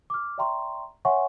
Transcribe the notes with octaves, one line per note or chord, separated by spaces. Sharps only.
D6 F6
D5 E5 G5 A#5 C6 C#6
C#5 E5 F#5 G#5 C6 C#6